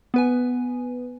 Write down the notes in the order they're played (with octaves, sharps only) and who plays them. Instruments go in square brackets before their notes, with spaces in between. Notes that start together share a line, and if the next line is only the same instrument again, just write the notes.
[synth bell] B3 B4 G#5